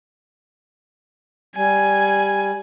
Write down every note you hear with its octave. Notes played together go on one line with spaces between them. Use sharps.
G3 G#5